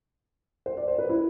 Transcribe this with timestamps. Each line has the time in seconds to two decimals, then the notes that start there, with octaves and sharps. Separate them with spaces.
0.66 C5
0.77 D5
0.88 C5
0.98 B4
1.09 E4